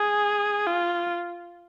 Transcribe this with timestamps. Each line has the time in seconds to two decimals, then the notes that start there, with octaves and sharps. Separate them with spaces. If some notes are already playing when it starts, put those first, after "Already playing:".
Already playing: G#4
0.67 F4